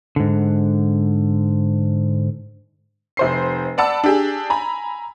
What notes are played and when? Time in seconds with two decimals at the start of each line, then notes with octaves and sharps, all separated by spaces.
0.16 G#2 D3
3.17 F1 C5 C7
3.78 D5 F#5 A5 B5 E6
4.04 D4 G4 G#4
4.50 G#5 A#5 B5